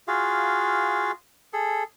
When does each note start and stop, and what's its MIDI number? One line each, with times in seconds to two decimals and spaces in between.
0.08 1.12 65
0.08 1.12 66
0.08 1.12 68
0.08 1.12 77
1.53 1.83 68
1.53 1.83 69